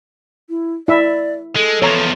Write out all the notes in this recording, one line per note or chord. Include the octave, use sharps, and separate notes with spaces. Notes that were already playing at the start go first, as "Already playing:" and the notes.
E4
E4 D5 E5
G#3 A4
E2 F3 C#5 A#5